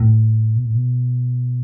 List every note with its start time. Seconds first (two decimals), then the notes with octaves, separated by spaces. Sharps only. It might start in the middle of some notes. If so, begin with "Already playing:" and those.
Already playing: A2
0.56 B2
0.65 A2
0.75 B2